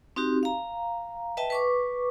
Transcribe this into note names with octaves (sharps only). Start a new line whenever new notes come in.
C4 D#4 F#4 G4
F5 A#5
B4 D#5 E5 G5 A5
B4 C#6 D6